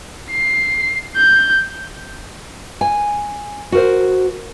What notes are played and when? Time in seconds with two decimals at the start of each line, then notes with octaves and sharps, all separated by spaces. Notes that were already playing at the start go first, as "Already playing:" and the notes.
0.31 C7
1.17 G6
2.81 G#5
3.72 F#4 A#4 C5